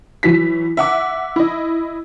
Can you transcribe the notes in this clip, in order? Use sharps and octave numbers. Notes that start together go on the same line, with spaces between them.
E3 F#3 B6
E5 F#5 D6
E4 D#5